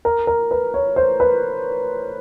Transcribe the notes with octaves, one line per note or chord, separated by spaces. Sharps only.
A#4
A#4
B4
C#5
C5
B4